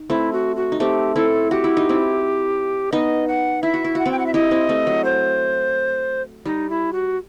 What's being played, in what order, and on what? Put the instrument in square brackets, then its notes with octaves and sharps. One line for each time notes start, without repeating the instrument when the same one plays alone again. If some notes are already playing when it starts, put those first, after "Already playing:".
Already playing: [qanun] D#4
[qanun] A3 C4 [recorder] E4
[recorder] F#4
F#4
[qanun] D#4
[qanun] A3 C4 [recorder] G4
[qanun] C4 E4 [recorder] A4
[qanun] F#4 [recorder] G4
[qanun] E4
D#4
C4 E4
[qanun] B3 D#4 [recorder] D#5
[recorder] F#5
[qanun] E4 [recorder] E5
[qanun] F#4
E4
[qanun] F#4 [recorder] F#5
[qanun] C4 E4
[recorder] G5
F#5
E5
[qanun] E4 G4 [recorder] D#5
[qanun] C4 E4
A3 C4
F#3
[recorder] C5
[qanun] G3 [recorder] D#4
[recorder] E4
F#4